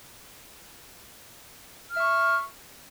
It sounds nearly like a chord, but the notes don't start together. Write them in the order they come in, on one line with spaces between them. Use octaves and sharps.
F6 E5 C#6